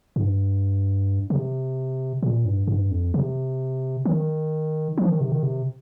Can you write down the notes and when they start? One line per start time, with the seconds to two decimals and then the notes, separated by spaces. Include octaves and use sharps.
0.16 G2
1.30 C3
2.23 A#2
2.45 G2
2.67 G2
2.91 F2
3.14 C3
4.05 D#3
4.98 F3
5.09 D#3
5.21 C3
5.32 D#3
5.43 C3